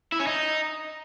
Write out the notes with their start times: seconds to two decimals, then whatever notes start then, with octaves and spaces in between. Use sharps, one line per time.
0.12 E4
0.20 C#4
0.27 D#4